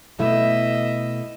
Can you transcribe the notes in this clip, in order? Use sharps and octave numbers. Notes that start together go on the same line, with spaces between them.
B2 A3 E4 D#5 E5